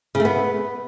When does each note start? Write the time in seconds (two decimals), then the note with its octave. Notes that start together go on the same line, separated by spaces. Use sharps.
0.15 C#3
0.20 A3
0.25 B3